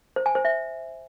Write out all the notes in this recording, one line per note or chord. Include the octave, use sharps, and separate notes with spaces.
C5
G#5
C5
E5